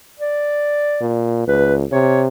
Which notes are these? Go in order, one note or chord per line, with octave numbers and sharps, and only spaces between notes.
D5
A#2
C#2 B4
C3 C#5